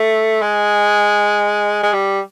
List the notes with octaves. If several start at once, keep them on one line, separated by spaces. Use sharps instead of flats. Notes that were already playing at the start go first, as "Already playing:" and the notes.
Already playing: A3
G#3
G#3
G3